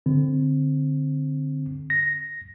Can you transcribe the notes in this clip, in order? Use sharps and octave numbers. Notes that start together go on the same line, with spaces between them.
D3 C4
A#6